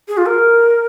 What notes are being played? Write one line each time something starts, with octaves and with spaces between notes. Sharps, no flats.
G#4
F4
A#4